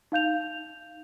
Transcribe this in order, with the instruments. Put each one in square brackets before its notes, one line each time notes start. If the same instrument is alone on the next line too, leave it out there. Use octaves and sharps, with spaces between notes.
[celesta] D#4 F5 G6 F7